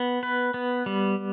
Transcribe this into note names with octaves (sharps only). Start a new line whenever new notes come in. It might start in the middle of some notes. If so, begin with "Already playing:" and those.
Already playing: B3
B4
B3
G3